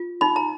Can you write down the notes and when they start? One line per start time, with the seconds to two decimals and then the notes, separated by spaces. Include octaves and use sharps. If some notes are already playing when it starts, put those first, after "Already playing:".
Already playing: F4
0.21 D#4 B5
0.36 A#5